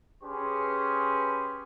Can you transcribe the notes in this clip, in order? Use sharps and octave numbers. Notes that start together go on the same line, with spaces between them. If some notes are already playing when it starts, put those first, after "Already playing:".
C#4 G4 G#4 B4 C6